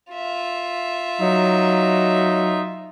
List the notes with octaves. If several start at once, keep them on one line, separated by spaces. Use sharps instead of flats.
F4 E5
F#3 D#4